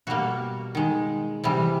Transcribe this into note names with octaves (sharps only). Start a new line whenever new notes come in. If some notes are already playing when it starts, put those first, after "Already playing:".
B2 G3 A#3 F#4
D#3 G#3
C3 E3 G3